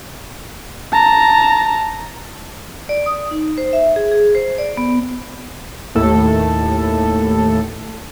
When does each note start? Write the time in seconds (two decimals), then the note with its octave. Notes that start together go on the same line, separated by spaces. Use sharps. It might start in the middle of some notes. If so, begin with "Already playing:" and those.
0.93 A5 A#5
2.89 D5
3.06 D#6
3.31 D#4
3.58 C5
3.73 E5
3.96 G#4
4.11 G#4
4.35 C5
4.58 D5
4.77 B3
5.95 D#2 A2 A4